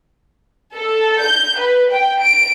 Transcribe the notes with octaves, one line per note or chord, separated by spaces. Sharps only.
A4
G6
B4
G5
D7